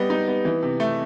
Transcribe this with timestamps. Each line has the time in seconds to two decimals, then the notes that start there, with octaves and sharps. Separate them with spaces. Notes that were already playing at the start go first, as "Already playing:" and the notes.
Already playing: G3 B3 D#5
0.10 D#4
0.28 B3
0.45 E3
0.63 C3
0.80 A3